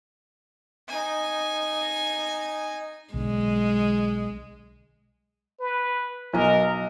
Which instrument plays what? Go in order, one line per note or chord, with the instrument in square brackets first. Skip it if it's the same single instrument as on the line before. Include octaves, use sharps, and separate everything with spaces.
[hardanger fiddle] D#4 G#5
[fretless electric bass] B1 D3 [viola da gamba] G#3
[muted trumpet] B4
[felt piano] B1 D#5 [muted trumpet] A#4